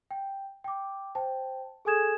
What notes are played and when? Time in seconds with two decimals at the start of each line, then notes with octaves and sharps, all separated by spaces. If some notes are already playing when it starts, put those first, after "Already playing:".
0.11 G5
0.64 G5 D6
1.15 C5 G5 A5
1.85 G#4 A4 G#5 D#6 G#6 E7